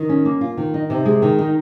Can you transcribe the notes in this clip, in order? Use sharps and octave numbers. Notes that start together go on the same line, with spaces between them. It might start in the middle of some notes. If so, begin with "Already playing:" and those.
Already playing: D#3
C#4
A#3
F4
D#3
D#4
C3
G#3
D#3
D#4